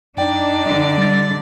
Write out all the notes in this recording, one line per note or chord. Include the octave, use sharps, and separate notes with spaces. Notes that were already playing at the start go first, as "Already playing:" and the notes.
F#2 D4 D#4 D5 G5
D3
G3 A6